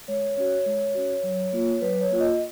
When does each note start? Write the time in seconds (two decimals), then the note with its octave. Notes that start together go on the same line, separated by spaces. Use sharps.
0.08 G#3 C#5
0.37 C#4 F#4 C#5
0.66 G#3
0.95 C#4 F#4
1.24 F#3
1.53 A#3 F4
1.82 F#3 B4
2.01 C#5
2.11 A#3 F4
2.20 D#5